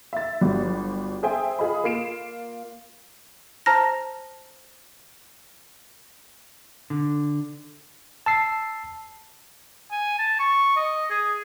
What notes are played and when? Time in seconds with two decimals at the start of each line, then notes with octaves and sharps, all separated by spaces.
0.13 E5 A6
0.41 G1 F#3 G3
1.23 G#4 C5 E5 G5 G#5
1.59 F4 G#4 D#5 B5
1.84 A#3 F4 C7 D7 E7
3.66 C5 A5 A#5 F6 A#6
6.90 D3
8.26 A5 E6 C7
9.91 G#5
10.19 A5
10.40 C#6
10.76 D#5
11.10 G#4